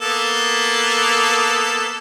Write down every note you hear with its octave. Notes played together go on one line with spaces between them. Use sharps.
A#3 B3 A4